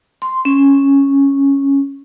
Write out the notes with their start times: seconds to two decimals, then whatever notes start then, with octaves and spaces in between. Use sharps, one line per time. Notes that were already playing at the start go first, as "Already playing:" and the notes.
0.22 C6
0.45 C#4